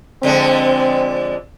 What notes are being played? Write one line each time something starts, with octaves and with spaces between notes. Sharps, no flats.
F2 D3 G#3 C4